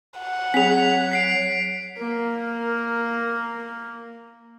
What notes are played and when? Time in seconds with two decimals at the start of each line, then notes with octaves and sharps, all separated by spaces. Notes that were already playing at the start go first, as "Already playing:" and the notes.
0.19 F#5
0.54 F#3 C4 G#4 C#5 B6 F7
1.11 B6 C7 D7
1.98 A#3 A#4